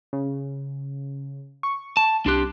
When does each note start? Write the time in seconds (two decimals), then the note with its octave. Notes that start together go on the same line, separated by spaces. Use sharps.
0.13 C#3
1.63 C#6
1.97 A5
2.26 C2 D4 G4 C6 F#6